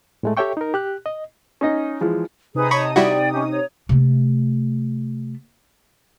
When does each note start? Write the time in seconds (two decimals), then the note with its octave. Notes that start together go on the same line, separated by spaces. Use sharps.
0.23 A2 G#3 A3
0.37 G4 A4 C#5 E5 G5 C#6
0.57 D#4 A#4
0.74 G4 F#6
1.06 D#5
1.61 C#4 D#4 D#5
2.01 E3 F3 G#3
2.55 C3 D#4 G#4 B4 D#6
2.71 C#5 A5 B5 C#6
2.96 G3 E4 F#4 D5 G5
3.33 C#4 G4
3.50 C#5
3.89 C3 A3